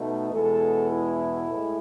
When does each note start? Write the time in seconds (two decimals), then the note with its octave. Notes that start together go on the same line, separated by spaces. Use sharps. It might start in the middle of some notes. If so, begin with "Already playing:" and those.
Already playing: B2 A3 D#4
0.32 E2 B2 G#3 A4
0.90 E4
1.47 A2 G#3